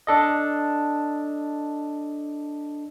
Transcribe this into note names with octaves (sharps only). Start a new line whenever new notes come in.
D4 A4 D#5